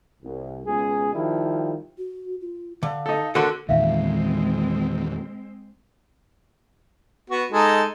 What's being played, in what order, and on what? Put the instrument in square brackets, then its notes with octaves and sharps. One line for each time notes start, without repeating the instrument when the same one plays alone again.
[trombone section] C2
C#2 B2 G#4
D#3 F3 G3 E4
[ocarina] F#4
F4
[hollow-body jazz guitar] D3 [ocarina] F5
[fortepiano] D#4 A4
[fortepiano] D3 F#4 [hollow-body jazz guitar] A4 A#4 C6
[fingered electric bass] E2 A#2 D#3 [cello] G#3 C4 [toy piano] E5 F5
[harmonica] B3 F#4
G#3 D#4 A4